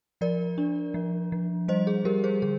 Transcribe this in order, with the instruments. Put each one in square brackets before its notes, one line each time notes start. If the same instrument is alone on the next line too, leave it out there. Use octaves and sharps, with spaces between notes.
[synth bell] F3 A#4 D5
D4
F3
F3
G3 C5 D#5
G#4
G3 G4 A#4
G#4 C5
D3 G#4